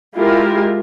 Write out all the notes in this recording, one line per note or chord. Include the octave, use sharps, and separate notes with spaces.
G#3 E4 F4 G4 A#4